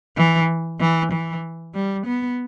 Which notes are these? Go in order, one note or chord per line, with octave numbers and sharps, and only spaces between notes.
E3
E3
E3
G3
B3